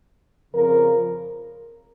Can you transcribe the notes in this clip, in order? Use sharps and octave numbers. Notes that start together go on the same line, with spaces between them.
F2 C#3 F3 A#4